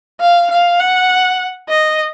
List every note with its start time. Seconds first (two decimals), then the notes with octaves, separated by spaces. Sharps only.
0.20 F5
0.51 F5
0.80 F#5
1.69 D#5